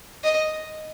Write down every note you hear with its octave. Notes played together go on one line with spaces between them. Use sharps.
D#5